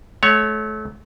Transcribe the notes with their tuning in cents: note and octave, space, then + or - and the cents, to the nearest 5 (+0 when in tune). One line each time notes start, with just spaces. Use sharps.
A3 -30 C#5 +0 F#5 +0